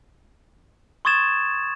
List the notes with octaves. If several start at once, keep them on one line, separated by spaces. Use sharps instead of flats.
C6 C#6 D#6 G#6 A6 E7